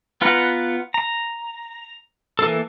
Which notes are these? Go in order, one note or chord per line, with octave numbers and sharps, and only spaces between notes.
B3 F4 B4 F#5 A#5
A#5
E3 A#3 A4